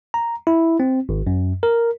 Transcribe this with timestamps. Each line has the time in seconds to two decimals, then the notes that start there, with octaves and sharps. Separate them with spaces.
0.14 A#5
0.47 E4
0.80 C4
1.09 G#1
1.27 F#2
1.63 A#4